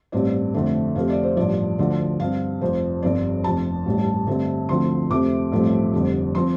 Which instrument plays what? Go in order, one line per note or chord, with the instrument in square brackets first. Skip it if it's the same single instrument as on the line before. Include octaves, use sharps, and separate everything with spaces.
[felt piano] A1 G2 G3 C4 D5
F1 F2 D3 A3
F2 C3 A3 C4 F5
D5
C5
A1 G2 F3 D5
D2 D3 F3 D5
G2 G3 C4 F5
F1 F2 F3 C5
G1 G2 F3 C4 D5
F1 F2 F3 A5
A1 G2 G3
G2 D3 A3 C4
D2 D3 F3 C4 C6
F2 C3 A3 C4 D6
A1 G2 F3 A3 C4
F1 F2 D3 G3
F3 C4 C6